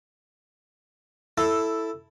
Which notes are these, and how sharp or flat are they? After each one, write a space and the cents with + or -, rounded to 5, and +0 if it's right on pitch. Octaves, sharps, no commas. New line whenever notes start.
E4 +0 A4 +5